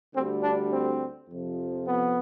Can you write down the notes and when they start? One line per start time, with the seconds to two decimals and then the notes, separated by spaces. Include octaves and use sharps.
0.13 D2 D3 G3 C4
0.42 D4
0.71 C4
1.29 F2 C3 F3
1.86 B3